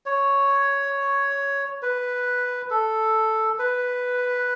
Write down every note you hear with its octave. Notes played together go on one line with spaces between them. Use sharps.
C#5
B4
A4
B4